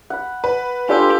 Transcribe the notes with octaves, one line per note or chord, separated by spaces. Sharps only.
F#5 B5
B4
D4 F4 G4 A4 C5 D5 E6